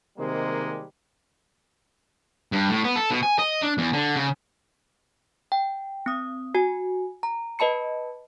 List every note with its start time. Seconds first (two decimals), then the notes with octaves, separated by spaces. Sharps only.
0.18 C3 D#3 G3 G#3 A#3 C4
2.52 G2
2.69 A2
2.84 B3
2.96 A4
3.11 B2
3.23 G#5
3.39 D#5
3.62 D4
3.78 E2
3.93 D3
4.16 C#3
5.52 G5
6.06 C4 D#6
6.55 F#4 G#5
7.23 A#5
7.59 B4 D#5 A5 B5 C#7